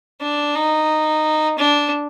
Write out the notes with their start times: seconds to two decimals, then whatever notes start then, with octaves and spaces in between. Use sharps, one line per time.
0.21 D4
0.55 D#4
1.59 D4